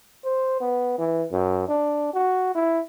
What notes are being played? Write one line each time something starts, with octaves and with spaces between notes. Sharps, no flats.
C5
B3
E3
F#2
D4
F#4
E4